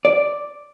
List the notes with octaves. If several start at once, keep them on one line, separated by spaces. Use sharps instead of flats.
D5